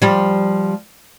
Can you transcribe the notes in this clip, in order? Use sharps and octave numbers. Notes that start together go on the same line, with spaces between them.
F3 G3